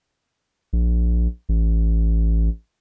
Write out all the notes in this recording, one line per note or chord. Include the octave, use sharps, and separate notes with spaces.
A#1
A1